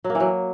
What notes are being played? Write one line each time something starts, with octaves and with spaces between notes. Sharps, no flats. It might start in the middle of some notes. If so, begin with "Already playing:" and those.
F#3
A#3
E3
F#3